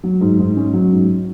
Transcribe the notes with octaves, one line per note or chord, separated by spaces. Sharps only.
F#3
G#2
G#2
C#4
F#3
G#2